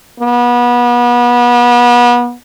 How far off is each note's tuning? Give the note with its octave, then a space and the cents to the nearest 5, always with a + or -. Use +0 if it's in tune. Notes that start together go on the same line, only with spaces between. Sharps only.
B3 -30